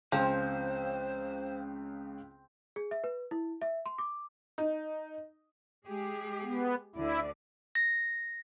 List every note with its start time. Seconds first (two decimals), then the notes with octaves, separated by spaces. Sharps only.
0.12 C#2 C#3 F3 C4 C5 G5
2.76 G#4
2.91 E5
3.04 B4
3.31 E4
3.62 E5
3.86 C6
3.98 D6
4.58 D#4
5.86 G#3 G4 G#4
6.44 B3
6.96 D2 D3 E4 D5
7.75 A#6